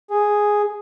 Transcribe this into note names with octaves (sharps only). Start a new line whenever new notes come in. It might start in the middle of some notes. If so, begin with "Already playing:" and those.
G#4